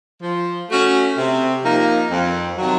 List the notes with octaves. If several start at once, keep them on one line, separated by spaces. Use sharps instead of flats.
F3
A3 C#4 F#4
C3
F3 A#3 D#4
F2
C3 D#3 F#3